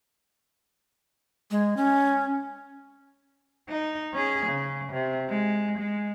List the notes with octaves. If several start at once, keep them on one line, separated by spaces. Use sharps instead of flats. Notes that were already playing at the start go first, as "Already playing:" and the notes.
G#3
C#4
D#4
C#4 G#4
C#3
C3
G#3
G#3